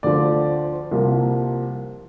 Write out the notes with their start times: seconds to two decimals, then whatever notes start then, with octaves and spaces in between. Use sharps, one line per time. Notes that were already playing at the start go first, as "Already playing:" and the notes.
0.03 D2 D3 F3 D5
0.91 C2 C3 F3 A#3